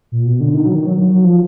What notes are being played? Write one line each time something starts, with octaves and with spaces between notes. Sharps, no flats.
A#2
B2
D3
D#3
F#3
D#3
F#3
F#3
F#3
F3